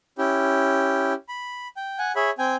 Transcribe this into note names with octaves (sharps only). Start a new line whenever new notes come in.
C#4 E4 G4
B5
G5
F#5 G#5
G#4 C#5 E5 B5
C4 G5 G#5